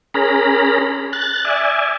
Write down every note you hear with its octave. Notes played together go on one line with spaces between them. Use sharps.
C#4 G#4 A#4 A#5 B5
F#6 A6
D5 E5 G#5